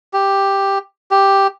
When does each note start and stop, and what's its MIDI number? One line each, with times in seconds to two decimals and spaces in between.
0.13 0.78 67
1.11 1.47 67